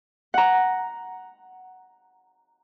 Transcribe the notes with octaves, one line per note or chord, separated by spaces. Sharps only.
F#5 A#5